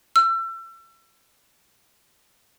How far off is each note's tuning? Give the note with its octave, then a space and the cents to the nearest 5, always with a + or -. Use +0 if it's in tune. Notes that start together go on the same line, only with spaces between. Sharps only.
E6 +35